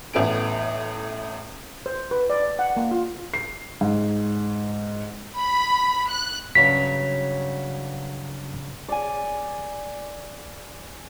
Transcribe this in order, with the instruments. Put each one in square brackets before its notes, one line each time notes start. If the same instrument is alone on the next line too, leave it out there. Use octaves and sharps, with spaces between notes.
[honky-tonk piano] A1 A2 B3 G#5 D7
[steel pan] C5
B4
D5
F#5
A#3
F4
[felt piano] C7
G#2
[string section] B5
F#6
[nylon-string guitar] G2 C#3 F#3 [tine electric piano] B6
[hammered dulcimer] D5 G#5